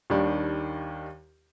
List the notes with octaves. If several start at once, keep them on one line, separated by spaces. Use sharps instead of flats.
D#2 D#3 G3 D4